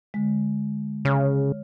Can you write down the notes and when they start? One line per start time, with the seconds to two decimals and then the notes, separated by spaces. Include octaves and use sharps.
0.14 D3 G#3
1.05 C#3 C#5 F6